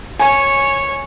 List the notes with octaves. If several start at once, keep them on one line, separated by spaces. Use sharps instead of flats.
C#5 G#5